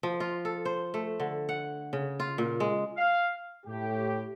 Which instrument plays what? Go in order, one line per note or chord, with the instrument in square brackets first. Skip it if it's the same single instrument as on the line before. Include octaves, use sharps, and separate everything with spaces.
[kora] F3
F4
A4
C5
A3
D3
F#5
C#3
F4
A#2
G#3
[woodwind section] F5
[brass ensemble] A2 G4